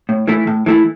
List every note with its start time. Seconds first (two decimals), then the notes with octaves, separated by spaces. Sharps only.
0.09 A2
0.28 E3 A3 E4
0.47 A2
0.66 E3 A3 E4